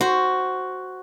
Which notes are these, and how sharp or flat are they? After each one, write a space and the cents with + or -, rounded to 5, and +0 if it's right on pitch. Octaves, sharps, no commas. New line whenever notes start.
F#4 +5 C5 +0